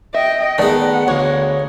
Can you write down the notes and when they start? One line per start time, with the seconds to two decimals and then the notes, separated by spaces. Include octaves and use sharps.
0.14 D#5 E5 G5
0.58 D#3 G#3 A3 B3 B4 D5 F#5
1.08 D2 G#3 A#3 C#5